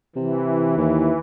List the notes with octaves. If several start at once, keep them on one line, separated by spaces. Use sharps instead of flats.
C3 E3
D#2